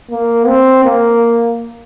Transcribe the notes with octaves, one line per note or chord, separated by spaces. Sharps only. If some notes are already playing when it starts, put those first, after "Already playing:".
A#3
C4
A#3